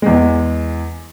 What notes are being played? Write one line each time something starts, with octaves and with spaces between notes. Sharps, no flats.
E2 G#3